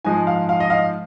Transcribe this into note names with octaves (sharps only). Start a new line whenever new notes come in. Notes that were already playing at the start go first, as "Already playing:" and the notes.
G#2 F3 G#3 G#5
F5
F5
D#5
F5